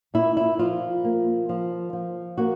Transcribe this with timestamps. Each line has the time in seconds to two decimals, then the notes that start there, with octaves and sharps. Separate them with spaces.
0.14 A#2 E4
0.37 E4
0.59 F3 F4
1.04 A#3
1.49 F3
1.93 F3
2.38 A#3 F#4